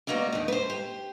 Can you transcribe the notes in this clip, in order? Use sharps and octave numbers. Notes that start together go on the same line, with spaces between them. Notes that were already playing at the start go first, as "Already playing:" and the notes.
G3 G#3 A#3 B3 F#4
D#2 D#3
B4 C5
G4